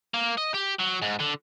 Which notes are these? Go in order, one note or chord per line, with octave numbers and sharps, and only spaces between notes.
A#3
D#5
G4
F#3
G#2
D3